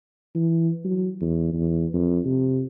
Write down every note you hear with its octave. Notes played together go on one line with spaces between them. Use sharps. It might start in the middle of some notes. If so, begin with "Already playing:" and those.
E3
F#3
E2
E2
F2
C3